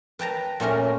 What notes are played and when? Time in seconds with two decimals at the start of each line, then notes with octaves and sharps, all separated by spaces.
0.19 B4 G5 A5 A#5
0.60 A#2 A3 C#4 A#4